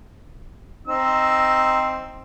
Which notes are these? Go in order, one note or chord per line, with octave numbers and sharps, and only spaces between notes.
C4 D#4 E6